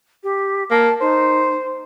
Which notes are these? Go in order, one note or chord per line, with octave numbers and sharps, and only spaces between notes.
G4
A#3 A5
D#4 C5